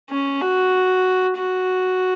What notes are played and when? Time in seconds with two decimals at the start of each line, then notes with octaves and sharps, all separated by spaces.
0.10 C#4
0.41 F#4
1.37 F#4